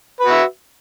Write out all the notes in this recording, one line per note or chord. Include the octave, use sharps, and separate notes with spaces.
F#4 B4 E5